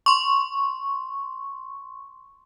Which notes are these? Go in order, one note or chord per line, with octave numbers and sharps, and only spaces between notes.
C6 C#6